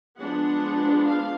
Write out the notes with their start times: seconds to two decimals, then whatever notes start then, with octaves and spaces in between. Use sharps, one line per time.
0.19 F3 G#3 B3 D4 F#5
1.04 F5